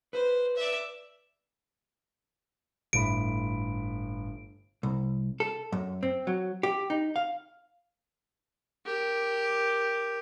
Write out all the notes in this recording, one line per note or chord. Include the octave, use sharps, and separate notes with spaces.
B4 C5
D5 E5
G1 A2 B5 D7
C2
A4
F#2
C4
F#3
G4
D#4
F5
G4 A#4